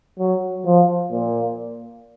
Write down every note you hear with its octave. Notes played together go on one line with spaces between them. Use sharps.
F#3
F3
A#2